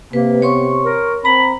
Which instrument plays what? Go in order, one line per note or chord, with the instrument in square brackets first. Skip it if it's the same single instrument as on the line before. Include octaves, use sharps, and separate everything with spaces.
[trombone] C3 [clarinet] A#3 [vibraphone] B4
[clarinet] B3 [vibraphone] C#5 C6 C#6
[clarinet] A#4
[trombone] C4 [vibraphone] A#5 [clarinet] B5